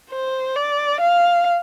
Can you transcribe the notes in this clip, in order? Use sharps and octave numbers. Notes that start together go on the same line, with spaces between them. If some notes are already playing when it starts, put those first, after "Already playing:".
C5
D5
F5